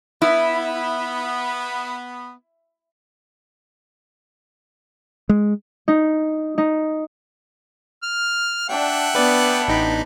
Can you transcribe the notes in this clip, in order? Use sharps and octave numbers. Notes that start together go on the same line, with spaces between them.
B3 E4
G#3
D#4
D#4
F6
D4 E5 F#5 G5
B3 D4 B4 D5
A1 D#4 B5